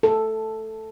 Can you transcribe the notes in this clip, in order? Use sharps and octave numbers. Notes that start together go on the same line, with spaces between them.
A4